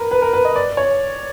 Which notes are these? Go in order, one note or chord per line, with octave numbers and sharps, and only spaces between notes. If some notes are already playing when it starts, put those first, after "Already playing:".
Already playing: A#4 B4
B4
A#4
B4
D#5
D5
C#5